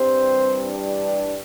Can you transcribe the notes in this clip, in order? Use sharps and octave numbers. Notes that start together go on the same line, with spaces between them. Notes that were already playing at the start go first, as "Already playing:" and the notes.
Already playing: G2 E3 G3 C4 C5
D4 D5